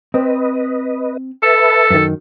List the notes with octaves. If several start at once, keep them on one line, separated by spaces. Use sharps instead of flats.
C4 B4 D#5
A4 B4 E5 A5
F#2 D#3